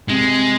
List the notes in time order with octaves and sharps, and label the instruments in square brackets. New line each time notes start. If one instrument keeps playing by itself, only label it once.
[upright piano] C3 [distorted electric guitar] G#3